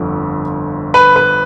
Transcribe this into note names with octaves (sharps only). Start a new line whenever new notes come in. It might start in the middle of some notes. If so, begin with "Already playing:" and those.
Already playing: G1 F2 D3
B4
B4